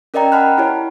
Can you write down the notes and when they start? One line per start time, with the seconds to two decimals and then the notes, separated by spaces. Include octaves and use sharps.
0.14 C#4 A#4 D5 D#5 G5 A#5
0.32 F#5 A5 B5 F6 F#6
0.58 E4 G4 C#5